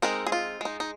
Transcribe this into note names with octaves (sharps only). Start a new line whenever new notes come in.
G#3 C4 D#4 A#4
G#4
F4
G#3 D#4
D#4